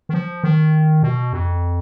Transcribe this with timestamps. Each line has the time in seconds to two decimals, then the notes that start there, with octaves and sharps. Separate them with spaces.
0.09 D#3
0.14 F3
0.44 D#3
1.03 B2
1.33 F2